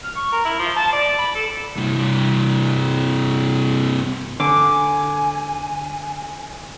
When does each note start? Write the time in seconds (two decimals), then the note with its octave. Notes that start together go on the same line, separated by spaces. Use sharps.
0.04 F6
0.16 C#6
0.32 A#4
0.45 E4
0.59 F3
0.76 A5
0.92 D5
1.18 B5
1.35 A4
1.76 G2 C3
4.40 D3 G#5 D6